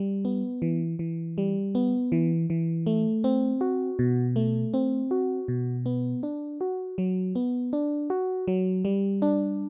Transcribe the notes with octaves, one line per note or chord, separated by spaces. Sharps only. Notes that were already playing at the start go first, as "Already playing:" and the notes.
Already playing: G3
B3
E3
E3
G3
B3
E3
E3
A3
C4
F#4
B2
A3
C4
F#4
B2
B3
D4
F#4
F#3
B3
D4
F#4
F#3
G3
D4